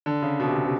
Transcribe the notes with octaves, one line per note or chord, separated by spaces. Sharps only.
D3
C#3
B2
C3
C#3
C3